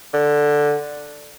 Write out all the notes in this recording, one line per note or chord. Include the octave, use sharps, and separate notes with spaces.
D3